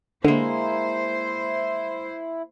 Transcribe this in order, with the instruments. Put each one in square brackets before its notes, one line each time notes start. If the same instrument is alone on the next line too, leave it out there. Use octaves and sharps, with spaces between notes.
[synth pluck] D3 [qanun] G#3 A#3 [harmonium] E4 [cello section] C5